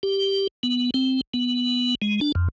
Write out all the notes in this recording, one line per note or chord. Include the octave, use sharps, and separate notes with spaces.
G4
B3
C4
B3
G#3
D4
F2